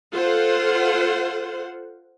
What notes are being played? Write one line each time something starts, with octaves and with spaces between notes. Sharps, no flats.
F4 A4 C5 F#5